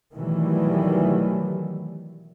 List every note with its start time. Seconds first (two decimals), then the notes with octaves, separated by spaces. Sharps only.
0.14 B2 D#3 E3 F#3 G3 A3